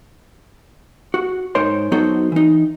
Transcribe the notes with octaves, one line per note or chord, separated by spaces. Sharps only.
F#4
G#2 D#4 A#4 C5 C#5 C6
F#3 B3 D#4 F#4 A4 C5
E3 D#4